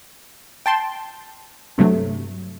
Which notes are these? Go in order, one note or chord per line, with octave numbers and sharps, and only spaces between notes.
G5 A5 C6
G2 C3 F#3 A3